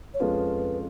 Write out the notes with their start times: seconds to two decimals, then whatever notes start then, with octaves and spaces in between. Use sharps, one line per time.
0.14 C#5
0.20 F2 F3 G#3 C#4 F4 B4